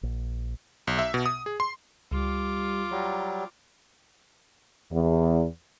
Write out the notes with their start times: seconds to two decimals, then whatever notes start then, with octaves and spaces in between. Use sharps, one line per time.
0.03 A#1
0.87 B1
0.99 E5
1.14 B2
1.26 D#6
1.46 G#4
1.60 C6
2.12 C#2 G3 F4 D6
2.91 F#3 G3 A#5
4.91 E2